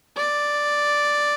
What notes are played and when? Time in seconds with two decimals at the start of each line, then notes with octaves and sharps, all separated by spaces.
0.16 D5